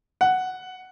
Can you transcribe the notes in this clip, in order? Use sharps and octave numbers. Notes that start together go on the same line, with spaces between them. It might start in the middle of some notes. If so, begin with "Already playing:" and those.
F#5